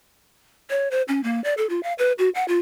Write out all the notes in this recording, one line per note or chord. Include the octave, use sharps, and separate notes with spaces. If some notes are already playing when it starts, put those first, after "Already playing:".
C#5
C5
C#4
A#3
D5
A4
F4
F5
B4
F#4
F#5
F4